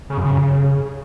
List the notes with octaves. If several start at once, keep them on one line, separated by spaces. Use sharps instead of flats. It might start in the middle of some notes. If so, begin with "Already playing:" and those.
C#3
F#2
C#3